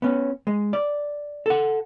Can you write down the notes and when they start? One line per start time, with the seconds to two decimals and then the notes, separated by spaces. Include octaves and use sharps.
0.02 B3 C#4
0.47 G#3
0.73 D5
1.46 A4 F#5